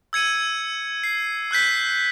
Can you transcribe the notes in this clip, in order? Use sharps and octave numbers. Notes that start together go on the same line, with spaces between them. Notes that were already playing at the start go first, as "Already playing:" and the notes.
E6 G#6 C#7 D#7
C7
E6 F#6 G6 B6